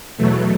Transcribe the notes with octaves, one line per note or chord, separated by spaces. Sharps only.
E2 B2 F#3 A3